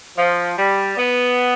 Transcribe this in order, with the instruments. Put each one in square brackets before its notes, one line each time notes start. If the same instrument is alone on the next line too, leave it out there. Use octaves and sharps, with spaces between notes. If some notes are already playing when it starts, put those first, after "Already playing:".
[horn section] F3
G3
B3